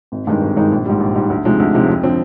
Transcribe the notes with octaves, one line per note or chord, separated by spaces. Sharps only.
G#1
G2 D#3 G#3 D#4
G#1
G2 D#3 G#3 D#4
A#1
G#2 G3
A#1
G#2 G3
D2
C3 F3 G#3 D#4
D2
C3 F3 G#3 D#4
F2
D3 F3 C4